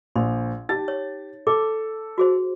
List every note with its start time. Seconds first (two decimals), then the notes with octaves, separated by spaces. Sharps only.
0.16 A#1 C6
0.69 D#4 G4 A6
0.88 C#5
1.47 A4 D6
2.18 F#4 G#4 C5